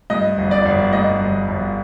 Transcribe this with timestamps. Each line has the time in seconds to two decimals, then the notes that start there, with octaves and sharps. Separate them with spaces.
0.10 G2 D#5
0.38 G1
0.51 D5
0.65 G1
0.93 G2 D#5
1.21 G1
1.48 G1